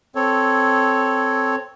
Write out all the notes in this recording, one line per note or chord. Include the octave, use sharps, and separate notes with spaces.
C4 A4 C#5